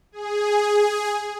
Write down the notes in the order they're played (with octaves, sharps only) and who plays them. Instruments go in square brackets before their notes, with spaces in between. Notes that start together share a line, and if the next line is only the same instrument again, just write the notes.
[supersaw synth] G#4